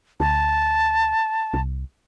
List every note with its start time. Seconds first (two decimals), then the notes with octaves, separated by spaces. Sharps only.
0.20 D2 A5
1.54 C2